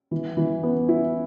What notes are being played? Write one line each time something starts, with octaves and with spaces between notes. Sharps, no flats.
E3
E3
B3
E4